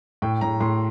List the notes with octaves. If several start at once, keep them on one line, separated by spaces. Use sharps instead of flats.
A2 G5
A2 A#5
A2 C6